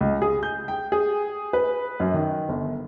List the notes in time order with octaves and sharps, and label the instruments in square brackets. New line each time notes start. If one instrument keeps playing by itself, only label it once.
[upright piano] C#2
G#4
G6
G5
G#4
B4
F#2
D#3
G1